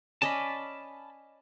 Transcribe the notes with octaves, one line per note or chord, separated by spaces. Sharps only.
C#4 D5 D#5 A5 B5